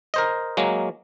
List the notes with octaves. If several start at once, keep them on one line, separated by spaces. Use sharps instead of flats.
A#4 C5 D#5
F#3 G#3 A#3